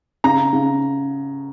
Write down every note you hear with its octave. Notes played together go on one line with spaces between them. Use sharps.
C#3 A#5
C#3